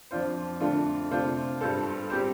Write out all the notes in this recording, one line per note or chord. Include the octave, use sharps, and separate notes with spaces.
F2 F3 D4 F4 C5
F2 D3 A3 D4 F4
C3 A3 D4 F4 C5
G2 G3 F4 A4 C5
G3 C4 G4 C5